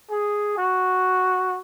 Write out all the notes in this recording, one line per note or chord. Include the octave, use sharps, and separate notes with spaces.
G#4
F#4